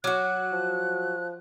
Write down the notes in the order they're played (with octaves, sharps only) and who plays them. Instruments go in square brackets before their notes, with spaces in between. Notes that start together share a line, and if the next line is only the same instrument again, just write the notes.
[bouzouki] F#3 F#4 [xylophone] C#5 D6 F6 [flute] F#6
[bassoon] F3